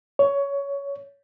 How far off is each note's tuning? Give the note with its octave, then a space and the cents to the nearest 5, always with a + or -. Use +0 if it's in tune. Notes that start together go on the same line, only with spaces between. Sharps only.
C#5 +15